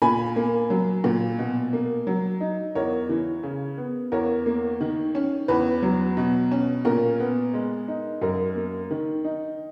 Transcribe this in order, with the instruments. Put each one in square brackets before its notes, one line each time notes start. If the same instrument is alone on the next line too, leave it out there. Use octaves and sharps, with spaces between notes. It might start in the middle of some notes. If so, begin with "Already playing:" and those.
[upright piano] A#2 G#5 B5
A#3
F#3
A#2
B2
A#3
F#3
D#4
E2 A#4 C#5
E3
C#3
B3
E2 A#4 C#5
A#3
D#3
C#4
E2 B4
F#3
B2
C#4
A#2 A#4
B3
G#3
D#4
F#2 A#4
A#3
D#3
D#4